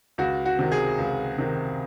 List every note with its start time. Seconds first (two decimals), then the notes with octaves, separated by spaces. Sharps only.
0.18 C#2 F#4
0.46 F#4
0.59 C3 D#3
0.72 G#4
0.98 C#2
1.38 C3 D#3